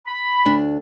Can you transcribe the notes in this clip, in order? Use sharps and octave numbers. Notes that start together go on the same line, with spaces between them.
B5
D2 D4